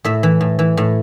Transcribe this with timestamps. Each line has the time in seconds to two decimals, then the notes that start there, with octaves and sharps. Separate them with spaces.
0.04 A2 E5
0.23 E3
0.41 A2
0.59 E3
0.77 A2